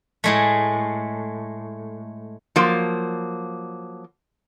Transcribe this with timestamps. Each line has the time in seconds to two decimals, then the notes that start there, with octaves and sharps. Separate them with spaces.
0.24 A2 G#3 A3
2.56 F3 F#3 A#3